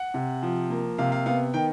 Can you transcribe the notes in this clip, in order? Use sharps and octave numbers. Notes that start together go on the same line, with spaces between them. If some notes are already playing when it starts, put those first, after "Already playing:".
Already playing: F#5
C3
F3
A#3
C3 F5
F5
B3 F5
D#3 G5